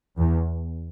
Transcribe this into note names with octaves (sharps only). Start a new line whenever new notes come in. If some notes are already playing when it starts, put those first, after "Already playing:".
E2